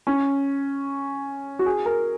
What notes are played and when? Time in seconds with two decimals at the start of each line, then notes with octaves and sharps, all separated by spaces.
0.07 C#4
1.59 F#4
1.66 G#4
1.86 A#4